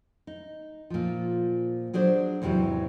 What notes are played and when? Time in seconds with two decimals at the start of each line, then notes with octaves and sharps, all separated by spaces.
0.27 D#4
0.90 A#2 F3
1.94 F#3 D4 G#4 C5 D5
2.42 E2 G#2 C3 E3 F#3